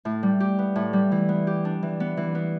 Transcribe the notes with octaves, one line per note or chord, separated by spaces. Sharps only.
A2
G3
G4
B3
A2
G3
E3
B3
G4
D4
E3
B3
E3
B3